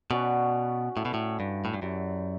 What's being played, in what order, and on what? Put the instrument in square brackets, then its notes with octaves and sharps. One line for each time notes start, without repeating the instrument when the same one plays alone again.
[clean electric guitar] B2 [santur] C#4 F#4 B4 D5
[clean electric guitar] A2 [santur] E4 A4 E5
[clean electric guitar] B2
A2
G2
A2
G2
[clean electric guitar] F#2 [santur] E4 G4 D5